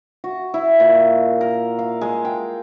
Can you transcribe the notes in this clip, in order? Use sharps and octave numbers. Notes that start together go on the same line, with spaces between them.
F#4
E4
A#2
A#4
F5
G#3
G5